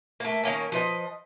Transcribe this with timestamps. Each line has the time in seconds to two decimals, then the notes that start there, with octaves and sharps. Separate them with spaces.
0.20 A3 A#3
0.43 D#3 A#3 C#4
0.72 F3 B4 D#5